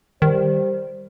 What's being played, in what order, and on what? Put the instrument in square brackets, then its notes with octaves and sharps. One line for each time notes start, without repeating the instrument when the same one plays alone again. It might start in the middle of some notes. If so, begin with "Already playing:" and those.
[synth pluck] D#3 [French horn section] G3 C5